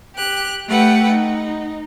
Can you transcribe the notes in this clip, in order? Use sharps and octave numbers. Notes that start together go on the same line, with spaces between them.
G4 F#6
A3 G4 B4 F#5 G5
D#4